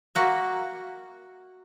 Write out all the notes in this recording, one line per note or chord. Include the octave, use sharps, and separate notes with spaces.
A#3 F#4 E5